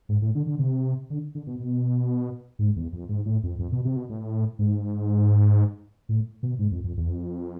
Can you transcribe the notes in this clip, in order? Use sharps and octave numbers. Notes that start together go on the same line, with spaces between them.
G#2
A2
D3
D3
C3
D3
D3
B2
B2
G#2
E2
F2
G#2
A2
F2
F2
B2
C3
B2
A2
G#2
A2
B2
G#2
F2
F2
E2
F2